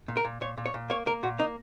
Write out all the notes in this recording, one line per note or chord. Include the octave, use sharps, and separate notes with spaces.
A#2
A#4
A#2
A#2 C#5
A#2
C#5
A#2
A#3 C#5
A#3 A#4
A#2 F#4
A#3 D#4